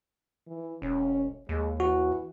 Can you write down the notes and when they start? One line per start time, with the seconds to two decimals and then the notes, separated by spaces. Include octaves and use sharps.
0.47 E3
0.82 E1 C#4
1.49 D#2 G#3
1.80 E3 F#4